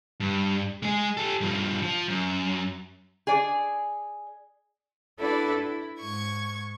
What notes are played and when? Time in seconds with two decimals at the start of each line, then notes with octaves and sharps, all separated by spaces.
0.20 G2
0.82 G#3 G#4
1.17 G4 A4
1.41 G2 F3
1.82 F3
2.08 F#2
3.27 G#4 D5
5.19 D4 E4 F#4 A4 B4 D5
5.59 E4
6.01 G#2 C#6 G#6